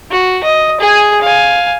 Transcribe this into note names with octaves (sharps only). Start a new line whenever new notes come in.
F#4
D#5
G#4 G#5
F5 G#5